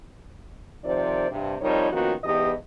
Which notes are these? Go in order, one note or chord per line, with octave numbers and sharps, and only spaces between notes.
C3 D#3 F3 C5 D5
G2 C3
F2 G3 D#4 F4 A#4 C#5
D#3 F3 A#3 B3 C#4 F#4
E2 G#2 E3 B3 G4 D#5